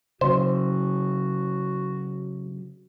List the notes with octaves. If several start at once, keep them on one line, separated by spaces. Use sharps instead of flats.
C#3 F#3 F#4 C5